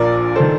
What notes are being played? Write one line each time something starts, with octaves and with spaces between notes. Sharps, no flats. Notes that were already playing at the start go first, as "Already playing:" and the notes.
Already playing: A#1 A#2 A#4 D5
D#3 A4 C5